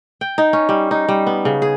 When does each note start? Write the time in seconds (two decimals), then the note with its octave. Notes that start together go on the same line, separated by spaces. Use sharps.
0.21 G5
0.38 D#4
0.53 C#4
0.69 G3
0.91 D#4
1.08 G3
1.27 B3
1.45 C#3
1.62 G#4